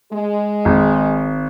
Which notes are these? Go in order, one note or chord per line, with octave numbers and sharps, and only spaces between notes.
G#3
G#1